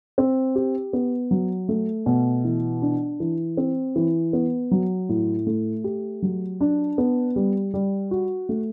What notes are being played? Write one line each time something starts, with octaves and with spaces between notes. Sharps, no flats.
C4
G4
B3
F#3
A3
B2
E3
D4
E3
C4
E3
B3
F#3
A2
A3
G4
F#3
D4
B3
G3
G3
F#4
A3